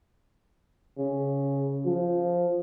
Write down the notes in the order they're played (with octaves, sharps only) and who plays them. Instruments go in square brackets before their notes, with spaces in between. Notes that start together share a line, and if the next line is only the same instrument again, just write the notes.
[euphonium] C#3
F3